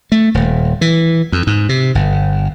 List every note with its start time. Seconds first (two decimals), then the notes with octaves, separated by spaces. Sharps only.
0.12 A3
0.34 D#1
0.81 E3
1.32 F2
1.47 G#2
1.69 C3
1.95 G1